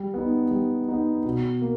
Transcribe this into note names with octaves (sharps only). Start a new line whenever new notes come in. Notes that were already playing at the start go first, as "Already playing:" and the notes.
Already playing: G3
B3 D#4
G3
B3 D#4
B2
A#3